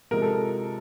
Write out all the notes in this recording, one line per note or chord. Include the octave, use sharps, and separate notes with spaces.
C3 F3 G#3 A#4
A4